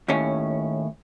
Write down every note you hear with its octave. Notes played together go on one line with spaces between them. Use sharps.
D#2 A2 C#4